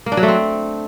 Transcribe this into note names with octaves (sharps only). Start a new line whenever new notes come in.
A#3
D4
F#3
A3
C4